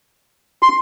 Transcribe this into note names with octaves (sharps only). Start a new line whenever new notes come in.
C6